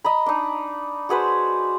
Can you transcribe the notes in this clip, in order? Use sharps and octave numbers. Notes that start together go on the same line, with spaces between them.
D#5 A#5 B5
D4 D#4
F#4 G#4 B4 C5